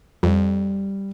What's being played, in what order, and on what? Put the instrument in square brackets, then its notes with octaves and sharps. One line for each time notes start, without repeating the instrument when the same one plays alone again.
[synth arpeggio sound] F2 [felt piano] G3